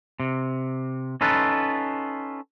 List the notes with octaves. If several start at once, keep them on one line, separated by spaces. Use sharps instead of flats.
C3
C#4 D#4 F4 A4 B4